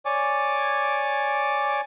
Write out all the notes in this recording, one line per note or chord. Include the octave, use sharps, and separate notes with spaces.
C#5 D5 G#5 D6